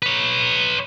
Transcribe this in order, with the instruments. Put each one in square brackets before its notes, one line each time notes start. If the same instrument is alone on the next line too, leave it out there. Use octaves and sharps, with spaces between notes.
[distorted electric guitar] B4 C#5